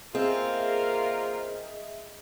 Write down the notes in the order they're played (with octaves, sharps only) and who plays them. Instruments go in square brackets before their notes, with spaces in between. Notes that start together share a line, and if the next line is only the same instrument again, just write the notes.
[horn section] A#3 F4 A#4 [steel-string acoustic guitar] C4 [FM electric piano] G#4 D#5 E5